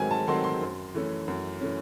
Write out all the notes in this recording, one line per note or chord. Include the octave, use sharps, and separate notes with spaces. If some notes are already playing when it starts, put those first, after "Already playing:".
Already playing: G#2 D#3 F#3 A3 C4 G#5
A5
D#3 F#3 A3 C4 C6
C6
F#2
E3 A3 C#4
F#2
E3 A3 C#4